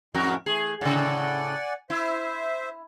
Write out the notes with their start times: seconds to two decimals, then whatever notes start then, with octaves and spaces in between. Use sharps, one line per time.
0.14 F2 A2 G#3 F#4 A#4
0.46 E3 A3 G#4
0.81 A2 C#3 D5 F#5 G#5
1.90 E4 C5 E5